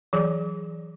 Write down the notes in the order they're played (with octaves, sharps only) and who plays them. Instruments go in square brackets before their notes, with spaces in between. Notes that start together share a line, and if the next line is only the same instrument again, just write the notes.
[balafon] E3 F#3 G#4 D5